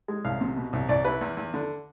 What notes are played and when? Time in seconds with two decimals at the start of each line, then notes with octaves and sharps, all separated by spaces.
0.08 G#3
0.25 C2 F5
0.41 C3
0.57 B2
0.73 C2
0.89 C2 D5
1.05 E4 B4
1.21 E2
1.37 E2
1.54 D3